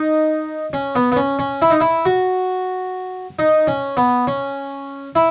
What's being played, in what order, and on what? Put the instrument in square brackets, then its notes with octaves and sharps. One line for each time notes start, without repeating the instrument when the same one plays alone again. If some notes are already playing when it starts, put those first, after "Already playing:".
Already playing: [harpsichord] D#4
C#4
B3
B3
C#4
C#4
E4
D#4
E4
F#4
D#4
C#4
B3
C#4
E4